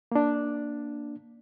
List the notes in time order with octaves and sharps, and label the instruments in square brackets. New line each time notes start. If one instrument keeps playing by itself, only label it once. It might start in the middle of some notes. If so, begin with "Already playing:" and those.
[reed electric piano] A#3 D4